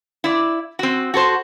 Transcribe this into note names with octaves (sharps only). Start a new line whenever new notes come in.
E4 D5
C4 F#4
F#4 A4 C5